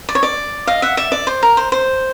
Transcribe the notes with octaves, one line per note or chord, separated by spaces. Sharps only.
D5
C#5
D5
D#5 F5
E5 F#5
D5 E5
D5
C5
A#4
C5
C5